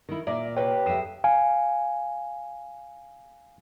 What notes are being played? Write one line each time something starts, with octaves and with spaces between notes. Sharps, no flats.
D#3 E4
A#2 A#4 D5 E5
C3 A#3 G4 B4 C#5 G5
F2 E5 D#6 C7 E7
F5 G#5